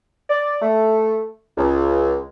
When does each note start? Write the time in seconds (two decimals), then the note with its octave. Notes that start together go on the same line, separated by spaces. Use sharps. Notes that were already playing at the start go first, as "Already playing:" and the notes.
0.30 D5
0.62 A3
1.58 C#2